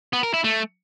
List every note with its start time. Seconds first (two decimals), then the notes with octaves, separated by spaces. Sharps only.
0.13 B3
0.23 A#4
0.34 E4
0.44 A3